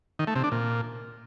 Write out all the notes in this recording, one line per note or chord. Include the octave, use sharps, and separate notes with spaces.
D#3
A3
C3
D4
A#2